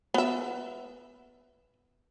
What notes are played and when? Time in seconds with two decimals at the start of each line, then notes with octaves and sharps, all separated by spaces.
0.14 B3 E5